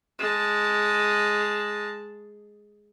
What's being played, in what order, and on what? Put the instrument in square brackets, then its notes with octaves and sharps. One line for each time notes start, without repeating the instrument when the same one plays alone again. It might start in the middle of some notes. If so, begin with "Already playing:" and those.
[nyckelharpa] G#3 A5